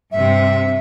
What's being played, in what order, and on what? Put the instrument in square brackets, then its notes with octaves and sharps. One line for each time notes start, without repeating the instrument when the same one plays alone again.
[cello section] G2 C3 [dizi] E5